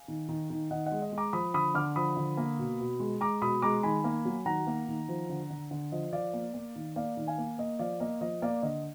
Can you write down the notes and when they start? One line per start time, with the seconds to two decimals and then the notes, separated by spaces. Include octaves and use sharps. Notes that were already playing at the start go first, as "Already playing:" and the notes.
Already playing: F5 G#5
0.08 D#3
0.29 D#3
0.50 D#3
0.71 D#3 D#5 F#5
0.86 D#5 F#5
0.92 G#3
1.02 D#5
1.12 G#3
1.18 A#5 D6
1.33 F3 B5 D#6
1.54 D3 B5 D#6
1.75 D3 D6 F6
1.96 F3 B5 D#6
2.17 D3
2.37 A#3
2.59 B2
2.80 B2
3.00 G#3
3.21 G#3 A#5 D6
3.42 B2 B5 D#6
3.62 G#3 A#5 D6
3.83 D#3 G#5 B5
4.04 A#3
4.25 F#3
4.45 D#3 F#5 A#5
4.67 A#3
4.88 D#3
5.09 F3
5.30 D3
5.50 D3
5.71 D3
5.92 F3 D#5
6.13 F3 D5 F5
6.34 A#3
6.54 A#3
6.76 D#3
6.96 A#3 D5 F5
7.17 D#3
7.27 F5 G#5
7.38 A#3
7.58 A#3 D#5
7.79 F3 D5 F5
8.00 A#3 D#5
8.21 F3 D#5
8.42 A#3 D5 F5
8.63 D3 D#5